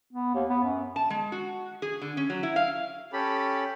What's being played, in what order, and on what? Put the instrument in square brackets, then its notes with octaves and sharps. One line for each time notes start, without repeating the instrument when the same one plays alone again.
[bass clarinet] B3
D#2
B3
F#2
[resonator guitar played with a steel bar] A5
G#3
F#4
G#4
D3
C#4
F#3
E4
F5
[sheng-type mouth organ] C#4 G4 A4 B5